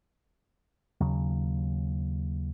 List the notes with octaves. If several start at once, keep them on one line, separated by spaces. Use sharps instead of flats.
D#2 C#3 F#3